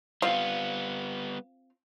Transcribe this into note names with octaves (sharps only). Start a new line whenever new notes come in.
G3 B3 C4 F4 F5